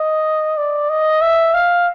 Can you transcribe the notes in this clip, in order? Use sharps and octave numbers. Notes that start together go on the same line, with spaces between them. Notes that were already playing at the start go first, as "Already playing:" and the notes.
Already playing: D#5
D5
D#5
E5
F5